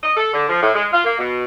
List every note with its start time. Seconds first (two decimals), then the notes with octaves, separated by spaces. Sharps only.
0.03 D#5
0.17 A4
0.34 D3
0.49 F3
0.62 A2
0.74 G#3
0.92 F4
1.05 A#3
1.18 B2